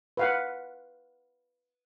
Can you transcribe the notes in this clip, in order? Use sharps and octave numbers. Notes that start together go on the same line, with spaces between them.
B4 F5 F#5